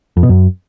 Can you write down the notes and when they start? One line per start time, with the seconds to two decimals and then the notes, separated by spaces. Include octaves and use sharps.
0.17 F2
0.23 B2
0.29 F#2